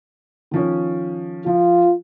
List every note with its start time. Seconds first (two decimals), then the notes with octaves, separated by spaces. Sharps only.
0.51 D#3 F3 C#4
1.46 F3 F4